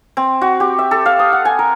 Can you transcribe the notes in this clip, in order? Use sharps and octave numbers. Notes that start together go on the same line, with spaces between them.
C4
F#4
G4
E5
A4
F5
D#6
F#5
G#5
A#4